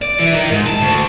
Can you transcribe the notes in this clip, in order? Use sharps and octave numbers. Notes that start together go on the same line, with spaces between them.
D5
E3
D#4 A#4
G#2
A5
D2